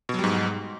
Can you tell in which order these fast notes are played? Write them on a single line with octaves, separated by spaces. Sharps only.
B2 F#3 G3 G#2